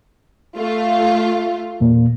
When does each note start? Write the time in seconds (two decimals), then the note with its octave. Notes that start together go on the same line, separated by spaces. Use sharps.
0.57 A3 F4
1.80 E2 A#2 A#3